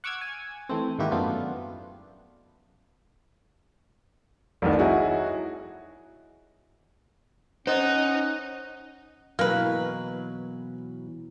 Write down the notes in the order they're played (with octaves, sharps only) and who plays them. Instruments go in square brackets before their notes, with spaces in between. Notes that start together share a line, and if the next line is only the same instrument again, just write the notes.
[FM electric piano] F#5 C#6 D6 E6 F6 G#6
G#5
E3 A3 C4
G#2 D#3 A#3 E4 F#4 G4
F#2 A3 B3 D4 F4
[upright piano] F1 C2 D#3
D#4 E4 F#4 G#4 C#5
[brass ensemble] C#4 [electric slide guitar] D#4 [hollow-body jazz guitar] C5 D#5 [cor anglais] F#5
[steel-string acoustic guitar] B2 E3 F#3 [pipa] A#3 B4